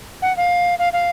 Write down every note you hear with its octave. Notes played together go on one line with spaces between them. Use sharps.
F#5
F5
F5
F5